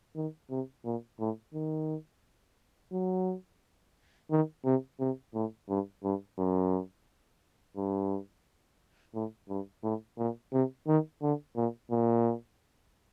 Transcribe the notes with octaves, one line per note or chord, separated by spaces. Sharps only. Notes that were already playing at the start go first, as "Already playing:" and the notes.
D#3
C3
A#2
A2
D#3
F#3
D#3
C3
C3
A2
G2
G2
F#2
G2
A2
G2
A2
A#2
C3
D#3
D3
A#2
A#2